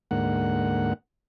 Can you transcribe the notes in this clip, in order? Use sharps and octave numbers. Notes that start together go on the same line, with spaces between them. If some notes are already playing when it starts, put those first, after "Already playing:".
D2 G#2 A#3 F#5